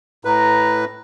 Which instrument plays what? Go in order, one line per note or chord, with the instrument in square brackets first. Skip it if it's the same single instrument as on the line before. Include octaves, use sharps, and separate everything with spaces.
[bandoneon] A2 B4 [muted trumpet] A#5